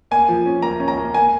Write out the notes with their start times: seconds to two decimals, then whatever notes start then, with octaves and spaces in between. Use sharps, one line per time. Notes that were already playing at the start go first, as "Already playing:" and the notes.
0.11 A#3 G#5
0.28 F3
0.46 C#4
0.62 A#3 A#5
0.80 C#4
0.88 A#5
0.97 A#3
1.14 A#3 G#5